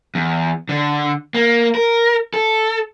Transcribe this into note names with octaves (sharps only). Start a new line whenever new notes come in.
E2
D3
A#3
A#4
A4